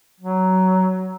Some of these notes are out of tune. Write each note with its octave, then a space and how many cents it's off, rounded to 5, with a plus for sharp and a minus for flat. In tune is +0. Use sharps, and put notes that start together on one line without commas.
F#3 +15